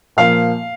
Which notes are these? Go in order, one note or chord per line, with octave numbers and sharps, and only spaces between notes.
A#2 F3 A#3 F5